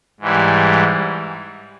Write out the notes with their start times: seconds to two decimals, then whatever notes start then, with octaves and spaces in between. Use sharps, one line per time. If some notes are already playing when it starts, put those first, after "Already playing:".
0.20 G#2 E3 G3